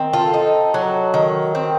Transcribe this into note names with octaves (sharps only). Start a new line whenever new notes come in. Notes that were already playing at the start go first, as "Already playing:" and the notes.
Already playing: D#3 C4
F4 A4
D#4
F#3
D#3
C4